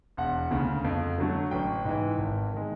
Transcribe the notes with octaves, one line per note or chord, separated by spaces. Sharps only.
E1 F#5
D2 C#3
F2
D3 F#3 A3
A1 G5
G#2 E3
G#1
D#3 G#3